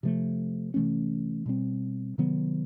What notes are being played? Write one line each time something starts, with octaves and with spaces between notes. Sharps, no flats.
C3 F3 A3
C3 E3 A3 C#4
B2 G3 C4
C3 D#3 F#3 B3